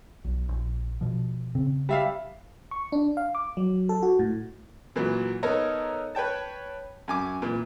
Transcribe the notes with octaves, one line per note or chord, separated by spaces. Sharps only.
B1
A#1
B2 F3
C#3 C4
G3 E5 F5
C#6
D4
F5
D6
F#3
A4
F#4
A2
A#2 E3 F#3
B3 D#4 A4 A#4 C#5 A#5
B4 C#5 G5 A5
F#2 G#5 D6
A#2 E3